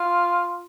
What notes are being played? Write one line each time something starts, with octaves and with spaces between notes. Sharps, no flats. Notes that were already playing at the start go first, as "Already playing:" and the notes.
Already playing: F4